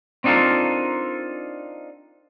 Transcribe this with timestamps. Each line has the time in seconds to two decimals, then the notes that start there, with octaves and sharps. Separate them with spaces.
0.24 C4 D4 D#4 F4 A4 A#4